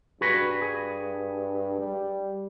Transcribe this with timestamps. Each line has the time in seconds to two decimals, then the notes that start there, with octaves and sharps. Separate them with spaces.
0.21 G2 F#4 G#4 B4
0.62 G#4
1.80 G3